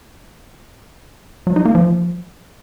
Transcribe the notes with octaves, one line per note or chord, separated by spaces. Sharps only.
F#3
D#4
A#3
F3